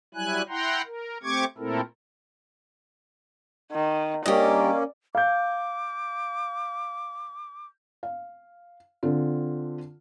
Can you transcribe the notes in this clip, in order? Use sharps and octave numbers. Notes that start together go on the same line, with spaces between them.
F#3 G3 E4 G#5 F#6
E4 F#5 G5 A#5 C6
A#4
A3 C4 G4 C#6 D6 G#6
A#2 A3 C4 E4 A4 A#4
D#3
G2 A#3 C#4 G4 D5 D#5
F5 D6 G6
F5
D3 C4 F4